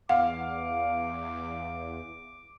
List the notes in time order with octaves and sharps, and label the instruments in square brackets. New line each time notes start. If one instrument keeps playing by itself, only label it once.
[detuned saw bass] E2 [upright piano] F5 [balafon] F#5 [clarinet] D6